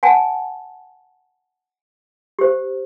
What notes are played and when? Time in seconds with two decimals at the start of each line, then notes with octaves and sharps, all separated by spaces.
0.03 F#5 G#5 A5
2.39 G4 C5